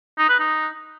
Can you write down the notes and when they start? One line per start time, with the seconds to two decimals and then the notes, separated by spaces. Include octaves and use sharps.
0.18 D#4
0.29 B4
0.40 D#4